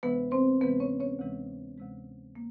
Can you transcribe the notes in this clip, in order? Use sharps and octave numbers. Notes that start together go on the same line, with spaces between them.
D2 C3 E3 G#3 B3 B4
C4 C5
D2 C3 E3 G#3 B3 B4
C#4 C#5
C#4 C#5
D2 C3 E3 G#3
D2 C3 E3 G#3
A#3